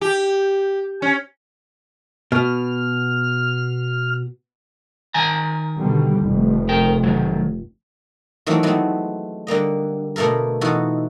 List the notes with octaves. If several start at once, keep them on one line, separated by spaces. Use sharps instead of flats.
G4
C#4
B2 F6
D#3 G#5 A#5
B2 D3 G3
F1 F2
A#4 G5
D#3 E3 F#3
D#3 E3 F#3 A3 A#3 C4
F#3 G#3 A3 B3 C4
D3 G3 A#3 D#5
B2 A3 A#3 A4 A#4
B2 E3 D#4 F4 F#4 A4